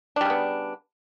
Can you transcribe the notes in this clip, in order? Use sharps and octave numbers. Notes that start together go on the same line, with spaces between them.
C#3 G3 B3 D4